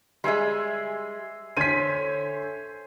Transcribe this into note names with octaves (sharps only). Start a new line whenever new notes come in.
G3 G#3 E5 G#5 C6
D3 C5 C#5 G#5 B6 D#7